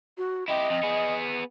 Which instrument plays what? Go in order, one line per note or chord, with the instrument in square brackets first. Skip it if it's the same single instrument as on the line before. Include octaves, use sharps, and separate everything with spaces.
[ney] F#4
[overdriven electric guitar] E4 G4 [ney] D#5
[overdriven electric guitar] F2
B3 G#4